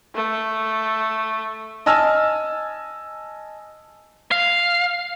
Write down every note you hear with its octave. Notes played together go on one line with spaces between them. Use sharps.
A3
D#5 G#5 A5 E6 F6
F5